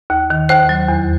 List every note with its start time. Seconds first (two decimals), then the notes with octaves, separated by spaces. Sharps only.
0.10 D#2
0.30 D#3
0.49 D#2 C5
0.69 F#3
0.88 E2